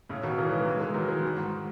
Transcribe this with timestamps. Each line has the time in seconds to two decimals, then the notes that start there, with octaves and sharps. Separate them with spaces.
0.10 A2 C#3
0.23 B2 D#3
0.38 C#3 E3
0.48 F#3
0.52 E3 G#3
0.66 E3 G#3
0.80 E3 G#3
0.94 D#3 F#3
1.08 E3 G#3
1.23 D#3 F#3
1.37 G#2